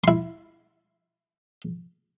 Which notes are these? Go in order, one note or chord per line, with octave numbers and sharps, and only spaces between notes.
E4 C6